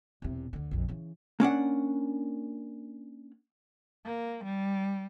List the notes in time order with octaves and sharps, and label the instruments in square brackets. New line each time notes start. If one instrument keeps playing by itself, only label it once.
[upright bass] E1 C3
D2 D3
A#1 F2
C#3 E3
[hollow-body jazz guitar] A#3 C#4 D4 F#5
[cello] A#3
G3